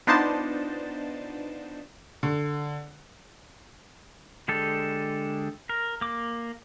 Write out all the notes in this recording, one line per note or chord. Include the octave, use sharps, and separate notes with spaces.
B3 D4 D#4 F4 C5 A5
D3
D3 G#3 G4 A4
A#4
A#3 D6